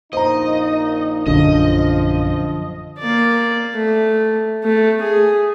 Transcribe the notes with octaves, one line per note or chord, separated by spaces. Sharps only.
A#1 A#3 D#4 C5 D#5 A#5
A#1 F#2 D3 F3 D#5
A#3 D5
A3
A3
G#4